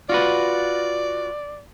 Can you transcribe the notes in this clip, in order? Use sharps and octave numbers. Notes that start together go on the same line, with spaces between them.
F4 F#4 B4 D5